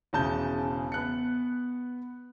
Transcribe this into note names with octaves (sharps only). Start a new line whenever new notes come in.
E1 C#3 A5 G6
B3 F#6 C#7